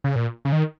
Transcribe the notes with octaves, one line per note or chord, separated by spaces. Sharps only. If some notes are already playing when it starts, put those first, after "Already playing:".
C#3
A#2
C#3
D#3